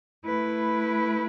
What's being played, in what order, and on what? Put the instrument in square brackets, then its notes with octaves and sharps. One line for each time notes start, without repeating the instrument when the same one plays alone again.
[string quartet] A3 E4 B4